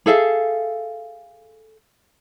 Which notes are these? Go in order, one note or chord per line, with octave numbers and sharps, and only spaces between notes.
G#4 A4 E5 F5